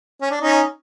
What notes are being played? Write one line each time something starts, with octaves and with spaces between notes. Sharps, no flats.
C#4
D4
C#4 D#4